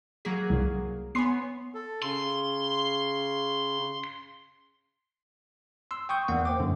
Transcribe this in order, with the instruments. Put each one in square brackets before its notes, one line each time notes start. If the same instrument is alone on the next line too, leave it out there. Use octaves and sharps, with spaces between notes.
[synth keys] F#3 A#3 G#4 [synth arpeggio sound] B6
[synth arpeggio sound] C2
[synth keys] B3 C#5 G#5 [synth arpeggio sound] C6 C7
[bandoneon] A4
[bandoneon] C#3 [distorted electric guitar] C6
[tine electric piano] C6 E6
G5 C#6 D#6 G6
E2 A#3 F#5
C5 G5 D6
F#2 D3